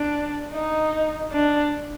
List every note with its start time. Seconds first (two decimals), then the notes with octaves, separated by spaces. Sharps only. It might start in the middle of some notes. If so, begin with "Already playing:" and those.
Already playing: D4
0.52 D#4
1.32 D4